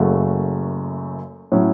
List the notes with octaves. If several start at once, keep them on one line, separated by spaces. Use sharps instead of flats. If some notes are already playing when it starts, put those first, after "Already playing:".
Already playing: F#1 F#2 C#3 A3 F#4
A2 F#3 C#4